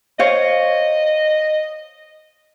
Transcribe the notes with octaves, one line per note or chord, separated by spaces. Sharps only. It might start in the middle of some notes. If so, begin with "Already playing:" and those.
C5 C#5 D#5 F5